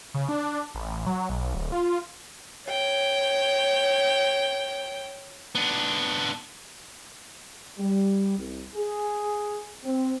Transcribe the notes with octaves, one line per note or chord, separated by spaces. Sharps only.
C#3
D4
A1
F#3
B1
D1
F4
C#5 G5
B3 D4
G3
C2
G#4
C4